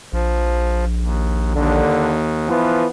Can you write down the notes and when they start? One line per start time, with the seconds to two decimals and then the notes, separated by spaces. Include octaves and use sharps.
0.13 A#1 F3
1.01 D#2
1.54 D#2 D3
2.48 E3 F3 B3